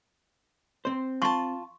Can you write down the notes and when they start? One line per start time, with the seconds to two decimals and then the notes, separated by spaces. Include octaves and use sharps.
0.85 C4 C5
1.22 F4 A5 C6 C#6